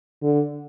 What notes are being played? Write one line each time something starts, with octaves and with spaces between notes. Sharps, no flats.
D3